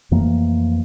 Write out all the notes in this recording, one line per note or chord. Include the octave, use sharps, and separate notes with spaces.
F2 E3 A3 A#3